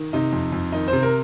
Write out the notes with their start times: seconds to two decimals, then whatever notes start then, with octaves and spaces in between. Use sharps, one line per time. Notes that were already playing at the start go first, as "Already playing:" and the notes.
Already playing: D#3
0.13 C3 D#4
0.33 F2
0.52 F2
0.72 D#3 D#4
0.88 C3 C5
1.03 A#4